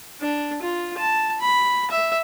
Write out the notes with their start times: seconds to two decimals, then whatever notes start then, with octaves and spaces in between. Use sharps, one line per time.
0.20 D4
0.62 F4
0.98 A5
1.40 B5
1.91 E5